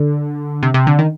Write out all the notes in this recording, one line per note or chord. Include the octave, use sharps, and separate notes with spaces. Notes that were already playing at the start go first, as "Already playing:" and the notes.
Already playing: D3
C3
C3
D3
D#3